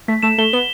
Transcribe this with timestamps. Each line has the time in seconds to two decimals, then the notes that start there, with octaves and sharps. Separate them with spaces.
0.08 A3 B6
0.23 A3 E7
0.38 A3 G7
0.53 B3 G7